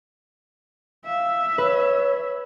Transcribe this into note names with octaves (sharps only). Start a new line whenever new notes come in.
E5 F5
B4 C#5